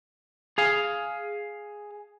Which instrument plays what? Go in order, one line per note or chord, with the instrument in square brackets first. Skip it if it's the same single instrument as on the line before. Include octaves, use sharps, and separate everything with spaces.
[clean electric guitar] G#4 F5